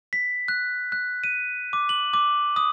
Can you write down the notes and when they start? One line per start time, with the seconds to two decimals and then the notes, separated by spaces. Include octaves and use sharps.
0.13 B6
0.48 F#6
0.92 F#6
1.24 D#7
1.73 D6
1.89 F#7
2.13 D6
2.56 D#6